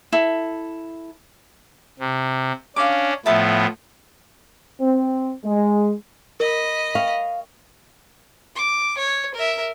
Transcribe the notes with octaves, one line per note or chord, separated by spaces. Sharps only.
E4 A4
C3
C#4 D4 F5 D6
A2 F3 B3 E5 A5
C4
G#3
A#4 D#5 B5
F5 G5 C#6
D6
C#5
A#4 E5